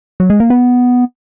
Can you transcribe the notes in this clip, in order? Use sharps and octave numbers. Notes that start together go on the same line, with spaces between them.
F#3
G#3
A#3
B3